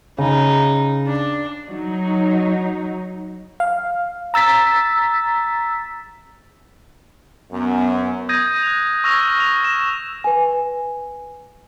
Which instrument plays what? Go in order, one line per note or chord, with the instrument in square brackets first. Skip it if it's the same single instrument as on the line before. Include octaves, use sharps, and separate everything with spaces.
[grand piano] C#3 [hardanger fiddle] D#4
[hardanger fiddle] D4
[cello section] F#3 D#4
[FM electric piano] F5
A#5 E6 A6 B6
[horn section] F#2 [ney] B3
[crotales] D#6 G6 G#6 A#6 D#7
F#6 F7
C#6 E6 F6 G#6 A#6 F7
F7
A#6 E7
[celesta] B4 G#5